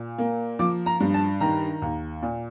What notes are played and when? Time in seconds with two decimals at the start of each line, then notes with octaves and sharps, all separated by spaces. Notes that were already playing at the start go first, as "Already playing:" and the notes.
Already playing: A#2
0.18 A#3
0.59 F3 D6
0.86 A#5
1.00 G2
1.14 A5
1.41 D#3 A#5
1.82 D#2
2.22 A#2